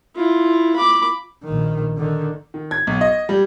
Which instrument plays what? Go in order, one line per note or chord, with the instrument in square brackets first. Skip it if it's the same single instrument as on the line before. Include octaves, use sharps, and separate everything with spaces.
[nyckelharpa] E4 F4
B5 D6
[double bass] A#1 D#3
D3 D#3
[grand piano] D#3
G#6
B1
D#5
G3